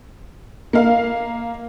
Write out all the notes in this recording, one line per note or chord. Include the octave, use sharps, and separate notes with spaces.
A#3 F5